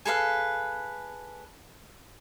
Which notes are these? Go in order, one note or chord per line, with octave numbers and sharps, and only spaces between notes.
G#4 A4 B4 F5